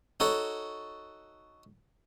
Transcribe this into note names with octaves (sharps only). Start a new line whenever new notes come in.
D#4 F#4 A4 C#5